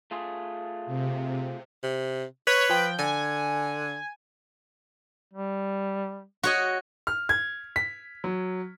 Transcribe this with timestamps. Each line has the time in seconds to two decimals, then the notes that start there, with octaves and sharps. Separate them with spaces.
0.11 A3 F4 G#4
0.86 C3
1.83 C3
2.47 B4 C#5
2.70 F3 G5
2.99 D3 G#5
5.33 G3
6.43 F#4 C#5 D#5
7.07 F6
7.29 G#6
7.76 B6
8.24 F#3